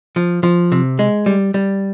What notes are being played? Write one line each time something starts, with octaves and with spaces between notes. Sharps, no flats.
F3
F3
C3
G#3
G3
G3